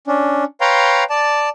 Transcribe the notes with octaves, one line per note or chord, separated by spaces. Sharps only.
C#4 D4
B4 C#5 F5 G5 A#5 C6
D5 A5